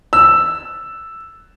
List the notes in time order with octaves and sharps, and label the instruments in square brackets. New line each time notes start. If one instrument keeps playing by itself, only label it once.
[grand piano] E6